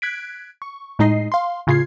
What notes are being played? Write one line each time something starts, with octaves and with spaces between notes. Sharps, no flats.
F#6 G#6 B6 D7
C#6
A2 G#3 D#4 D#5 C7
F5 C6
A2 C#3 F4 G#6 C7